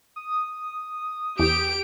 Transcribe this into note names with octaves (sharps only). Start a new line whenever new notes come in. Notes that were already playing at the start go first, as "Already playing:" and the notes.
D#6
E2 G4 D7